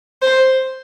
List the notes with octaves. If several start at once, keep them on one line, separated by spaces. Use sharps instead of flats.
C5